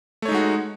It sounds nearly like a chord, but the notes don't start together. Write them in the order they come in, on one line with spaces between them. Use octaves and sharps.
A3 C#5 D#4 G#3 F#4